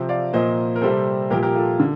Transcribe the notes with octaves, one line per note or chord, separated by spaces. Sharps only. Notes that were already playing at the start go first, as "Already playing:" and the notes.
Already playing: C3 F3 C4
D5 F5
A#2 F3 A#3 C5 D#5
A#4
C3 G3 C4 A4 C5
A#2 F3 A#3 G4 A#4
G4 A#4
F4 A4
D3